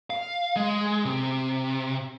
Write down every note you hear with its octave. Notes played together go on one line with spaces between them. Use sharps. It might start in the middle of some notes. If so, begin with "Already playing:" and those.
F5
G#3
C3